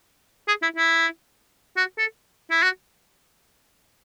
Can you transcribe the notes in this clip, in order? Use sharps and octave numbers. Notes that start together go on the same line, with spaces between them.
G#4
E4
E4
F#4
A4
E4
F#4